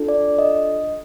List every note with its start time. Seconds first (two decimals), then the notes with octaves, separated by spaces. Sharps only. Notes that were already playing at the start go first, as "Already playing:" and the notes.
Already playing: D4 F4 A4
0.08 D5
0.39 D#5